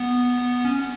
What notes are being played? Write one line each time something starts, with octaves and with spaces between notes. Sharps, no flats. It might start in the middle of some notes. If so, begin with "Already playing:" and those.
Already playing: B3
C#4